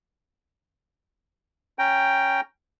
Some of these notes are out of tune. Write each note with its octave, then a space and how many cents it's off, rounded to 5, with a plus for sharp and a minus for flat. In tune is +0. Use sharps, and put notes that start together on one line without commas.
C#4 +0 G5 +0 A#5 +0